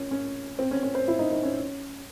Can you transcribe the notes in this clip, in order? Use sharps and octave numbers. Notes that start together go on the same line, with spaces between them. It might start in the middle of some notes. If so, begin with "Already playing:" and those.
Already playing: C#4
C#4
C4
C#4
C#4
C5
E4
D#4
D#4
C#4